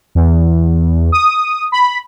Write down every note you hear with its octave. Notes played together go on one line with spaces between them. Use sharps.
E2
D#6
B5